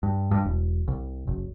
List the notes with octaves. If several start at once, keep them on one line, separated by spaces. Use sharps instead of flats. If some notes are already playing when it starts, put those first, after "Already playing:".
G2
G2
E1
C2
F#1